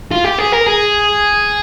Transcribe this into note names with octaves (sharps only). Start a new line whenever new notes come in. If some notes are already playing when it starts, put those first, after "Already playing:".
F4
G4
G#4
A#4
G#4